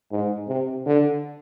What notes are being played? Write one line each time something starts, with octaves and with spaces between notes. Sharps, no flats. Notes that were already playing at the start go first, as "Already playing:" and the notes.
G#2
C3
D3